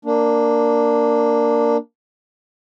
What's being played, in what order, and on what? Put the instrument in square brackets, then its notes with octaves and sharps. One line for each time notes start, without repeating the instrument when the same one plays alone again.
[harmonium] A#3 D4